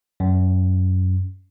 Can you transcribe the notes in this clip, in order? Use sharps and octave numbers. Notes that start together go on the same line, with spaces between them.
F#2